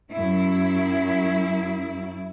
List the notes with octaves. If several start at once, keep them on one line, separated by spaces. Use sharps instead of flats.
F#2 E4